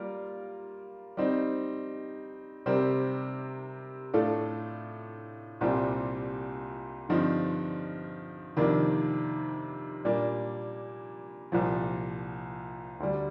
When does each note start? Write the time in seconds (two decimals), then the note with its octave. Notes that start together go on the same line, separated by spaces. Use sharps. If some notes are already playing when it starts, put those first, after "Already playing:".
Already playing: G3 A#3 F4 A#4
1.17 G3 C4 D#4
2.66 C3 G3 C4 G4 A#4
4.14 A2 A3 D4 F4 A4
5.61 C2 A#2 G3 C4
7.09 G2 D3 F3 C4 D#4
8.57 F2 C3 D#3 A#3 D4
10.05 A#2 G3 A#3 D4
11.52 C2 A#2 F3
13.00 D2 D3 G3